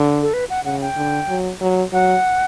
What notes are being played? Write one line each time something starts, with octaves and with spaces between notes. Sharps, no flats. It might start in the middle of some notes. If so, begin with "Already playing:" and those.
Already playing: D3
A4
B4
F#5
C#3 F#5
G5
D3
F#3
F#3
F#3 F#5